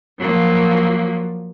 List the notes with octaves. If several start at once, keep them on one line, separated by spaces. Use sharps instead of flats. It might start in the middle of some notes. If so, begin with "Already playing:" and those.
F3 F#3 A#3